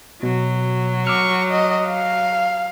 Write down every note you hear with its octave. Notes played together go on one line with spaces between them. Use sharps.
B2 F#3
C#6 D6 E6 F6
D#5
F5